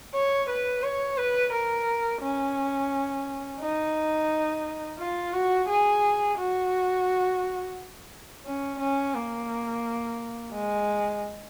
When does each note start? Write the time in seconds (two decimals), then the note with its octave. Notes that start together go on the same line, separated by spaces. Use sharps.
0.14 C#5
0.49 B4
0.83 C#5
1.17 B4
1.53 A#4
2.21 C#4
3.60 D#4
4.98 F4
5.33 F#4
5.68 G#4
6.37 F#4
8.46 C#4
8.80 C#4
9.14 A#3
10.53 G#3